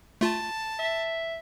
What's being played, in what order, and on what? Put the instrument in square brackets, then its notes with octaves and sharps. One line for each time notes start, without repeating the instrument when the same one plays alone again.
[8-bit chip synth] A3 F4 [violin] A5
[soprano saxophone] E5